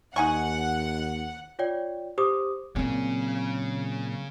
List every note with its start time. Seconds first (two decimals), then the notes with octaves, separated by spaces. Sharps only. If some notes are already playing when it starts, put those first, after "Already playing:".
0.16 D#2 D#4 F#5 G#5 C#6
1.59 F4 C#5 D5 G5
2.18 G4 C5 D6 D#6
2.76 A#2 C#3 F#3 C4 G#4